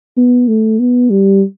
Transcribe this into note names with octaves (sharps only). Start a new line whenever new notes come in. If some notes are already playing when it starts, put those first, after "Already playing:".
B3
A3
B3
G3